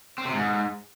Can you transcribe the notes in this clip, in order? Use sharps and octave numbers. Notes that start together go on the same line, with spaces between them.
C4
C3
G#2